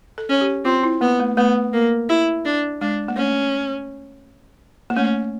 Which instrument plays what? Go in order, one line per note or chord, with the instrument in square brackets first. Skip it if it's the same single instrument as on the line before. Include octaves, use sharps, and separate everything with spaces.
[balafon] A4
[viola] C#4
[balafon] G4
[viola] C4 [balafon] F4
[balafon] E4
[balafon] A#3 [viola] B3
[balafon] A3
[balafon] A3 [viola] B3
[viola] A#3
E4
D4
[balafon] G#3 [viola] D4
[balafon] A#3
[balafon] A3 [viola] C#4
[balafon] A#3
[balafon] A3 [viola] C#4